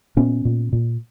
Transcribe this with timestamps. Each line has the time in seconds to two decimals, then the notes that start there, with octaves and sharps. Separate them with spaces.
0.16 A#2 B3 C#4
0.45 A#2
0.73 A#2